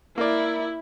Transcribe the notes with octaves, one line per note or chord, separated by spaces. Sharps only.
A#3 E4 D5